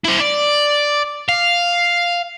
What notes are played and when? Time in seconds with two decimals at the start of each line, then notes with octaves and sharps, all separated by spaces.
0.05 E4 C5
0.20 D5
1.29 F5